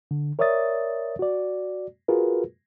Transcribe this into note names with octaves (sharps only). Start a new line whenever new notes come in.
D3
A#4 C#5 D5 E5 D#6 A6
F#4 D5
F4 F#4 G#4 A#4 B4